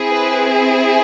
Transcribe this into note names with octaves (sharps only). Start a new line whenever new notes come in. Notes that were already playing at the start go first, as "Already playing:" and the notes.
Already playing: C4 E4 G#4
B4